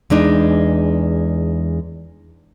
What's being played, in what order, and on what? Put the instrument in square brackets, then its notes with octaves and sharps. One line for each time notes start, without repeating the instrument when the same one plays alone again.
[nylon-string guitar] E2 G#3 D4 D#4